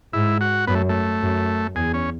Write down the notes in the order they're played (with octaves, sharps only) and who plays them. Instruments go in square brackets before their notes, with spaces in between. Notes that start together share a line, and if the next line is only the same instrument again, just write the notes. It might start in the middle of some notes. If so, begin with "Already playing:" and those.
[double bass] G#2 [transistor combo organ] E4
[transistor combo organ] F#4
[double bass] F#2 [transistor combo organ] B3
[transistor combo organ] A3
A3
[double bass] F#2
[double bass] E2 [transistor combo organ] G#4
[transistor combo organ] C#4